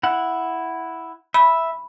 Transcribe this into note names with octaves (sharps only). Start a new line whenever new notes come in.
E4 F#5
E5 B5